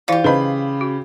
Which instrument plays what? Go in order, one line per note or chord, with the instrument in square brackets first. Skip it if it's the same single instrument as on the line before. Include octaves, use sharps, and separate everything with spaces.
[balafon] E3 E4 D5 [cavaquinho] F4 G4
[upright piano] C#3 B5 [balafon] B4 C5 D#5
[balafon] F#4